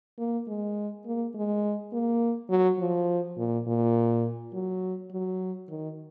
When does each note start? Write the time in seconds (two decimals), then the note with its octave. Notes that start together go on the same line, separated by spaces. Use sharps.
0.18 A#3
0.48 G#3
1.05 A#3
1.35 G#3
1.93 A#3
2.50 F#3
2.79 F3
3.38 A#2
3.67 A#2
4.53 F#3
5.12 F#3
5.69 D#3